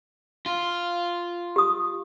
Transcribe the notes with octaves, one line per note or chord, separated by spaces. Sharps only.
F4
G4 D#6